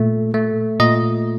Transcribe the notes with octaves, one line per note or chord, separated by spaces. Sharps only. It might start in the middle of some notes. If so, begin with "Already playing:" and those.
Already playing: A#2 A3
A3
A#2 D#5